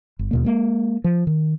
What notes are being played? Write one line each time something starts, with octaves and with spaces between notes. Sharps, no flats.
G1
D#2 B2 A#3
G#3 A#3
F3
D#3